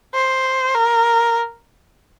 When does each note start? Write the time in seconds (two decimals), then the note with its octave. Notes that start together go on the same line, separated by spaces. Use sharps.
0.14 C5
0.74 A#4